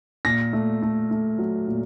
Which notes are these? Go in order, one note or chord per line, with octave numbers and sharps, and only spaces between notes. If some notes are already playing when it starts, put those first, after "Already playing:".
A#2 A#6
A3
A3
A3
F#3
A#2